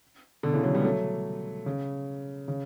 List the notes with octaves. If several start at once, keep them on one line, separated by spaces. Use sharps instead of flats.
B2 D3
C#3 E3
D3 F#3
G3 B3
F#3 A3
C#3
C#3